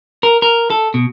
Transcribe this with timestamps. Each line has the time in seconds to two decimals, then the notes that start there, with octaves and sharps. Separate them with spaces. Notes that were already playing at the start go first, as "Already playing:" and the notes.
0.23 A#4
0.42 A#4
0.70 A4
0.94 B2